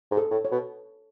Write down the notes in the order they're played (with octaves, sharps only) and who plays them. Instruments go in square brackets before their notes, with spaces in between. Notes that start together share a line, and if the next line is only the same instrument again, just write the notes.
[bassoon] G#2
[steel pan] A4
[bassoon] A2
[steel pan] C#5
[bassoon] B2